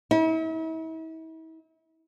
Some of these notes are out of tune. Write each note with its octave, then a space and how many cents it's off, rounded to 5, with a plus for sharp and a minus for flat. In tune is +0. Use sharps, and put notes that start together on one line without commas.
E4 -40